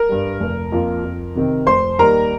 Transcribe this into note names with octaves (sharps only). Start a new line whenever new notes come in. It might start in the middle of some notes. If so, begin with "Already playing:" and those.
Already playing: A#4
G2 G3
F1
F2 F3 A#3 F4
F2
C3 D#3 C4
F1 C5 C6
D#2 D#3 G3 A#4 A#5